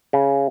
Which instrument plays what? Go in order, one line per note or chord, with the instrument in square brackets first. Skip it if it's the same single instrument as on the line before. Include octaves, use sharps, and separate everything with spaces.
[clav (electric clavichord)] C#3